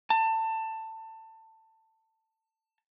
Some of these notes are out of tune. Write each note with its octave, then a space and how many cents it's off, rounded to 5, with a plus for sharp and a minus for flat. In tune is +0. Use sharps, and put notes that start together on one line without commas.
A5 +20